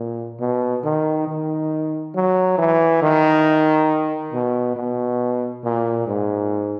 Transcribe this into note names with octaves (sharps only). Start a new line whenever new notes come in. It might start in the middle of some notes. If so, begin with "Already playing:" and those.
Already playing: A#2
B2
D#3
D#3
F#3
E3
D#3
B2
B2
A#2
G#2